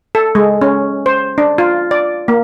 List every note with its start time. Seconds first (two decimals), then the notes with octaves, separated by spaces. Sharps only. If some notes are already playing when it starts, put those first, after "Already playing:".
0.15 A4
0.35 G#3
0.61 C#4
1.06 C5
1.38 D4
1.58 F4
1.91 D5
2.28 A#3